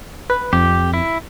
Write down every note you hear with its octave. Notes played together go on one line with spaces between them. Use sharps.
B4
F2 G4
E4